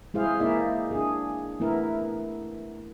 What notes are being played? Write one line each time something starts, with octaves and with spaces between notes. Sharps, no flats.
G#3 E4 G#4 C5 F5
A#3 D#4 E4 D5 E5 F5
D4 G#4
A3 B3 E4 A#4